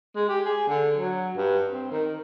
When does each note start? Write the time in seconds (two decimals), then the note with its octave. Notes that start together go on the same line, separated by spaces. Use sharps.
0.16 G#3
0.29 G4
0.45 G#4
0.68 D3
0.97 F#3
1.37 G2
1.70 C4
1.92 D#3